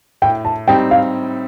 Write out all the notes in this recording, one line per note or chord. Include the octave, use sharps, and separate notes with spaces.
A2 G5
A5
G3 C4 D#4 G5
F5